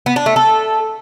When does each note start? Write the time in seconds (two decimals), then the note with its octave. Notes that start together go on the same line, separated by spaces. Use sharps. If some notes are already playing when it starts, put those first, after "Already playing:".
0.06 B3
0.16 D4
0.26 A3
0.36 A4